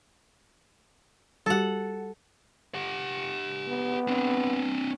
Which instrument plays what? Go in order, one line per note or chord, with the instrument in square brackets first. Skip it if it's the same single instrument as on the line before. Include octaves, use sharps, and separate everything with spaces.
[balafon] G3 F#4 G4 [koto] A4 F#5
[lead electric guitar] G4 F#5
[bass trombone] B3
[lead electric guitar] C4 D4